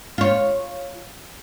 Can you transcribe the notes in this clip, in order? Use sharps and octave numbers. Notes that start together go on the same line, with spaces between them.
F4 C#5